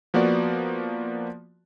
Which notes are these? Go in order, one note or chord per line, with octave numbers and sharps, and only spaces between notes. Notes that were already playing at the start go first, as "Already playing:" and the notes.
F3 A#3 B3 F#4 D5